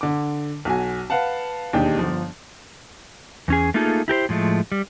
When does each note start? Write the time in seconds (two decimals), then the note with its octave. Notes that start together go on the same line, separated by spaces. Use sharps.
0.01 D3 D6
0.65 B1 F#4 G#5
1.10 B4 F5 F#5 A5
1.73 E1 D#2 D4 D#4 G4 G5
1.99 G1 F3
3.48 E2 C#4 G#4
3.74 A3 A#3 D#4 F4 G#4 A4
4.08 E4 G4 A#4 C5
4.29 A2 F3 G#3 A3
4.72 G3